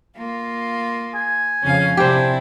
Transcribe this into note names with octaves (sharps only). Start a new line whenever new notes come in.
A#3 F4
G#5
F2 C#3 C#4 F5
C3 C4 D4 E4 G4 C5